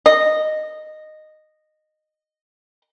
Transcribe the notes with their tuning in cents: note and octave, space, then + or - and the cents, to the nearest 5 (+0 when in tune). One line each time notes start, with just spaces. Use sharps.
D#5 -10